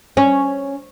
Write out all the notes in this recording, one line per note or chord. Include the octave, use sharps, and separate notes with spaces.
C#4